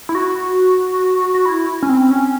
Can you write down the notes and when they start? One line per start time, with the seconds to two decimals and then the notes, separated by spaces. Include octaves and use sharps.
0.09 E4
0.15 F#4
1.35 F#4
1.46 E4
1.83 C#4
1.89 C4
2.11 C#4